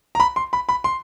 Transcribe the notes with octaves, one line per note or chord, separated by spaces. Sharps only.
A#5
B5
C6
B5
B5
C6